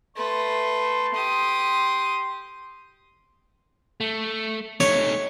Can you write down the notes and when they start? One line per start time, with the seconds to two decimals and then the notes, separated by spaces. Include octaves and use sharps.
0.16 A3 B4 C6
1.14 G4 D#6
4.00 A3
4.80 A3 D#4 C#5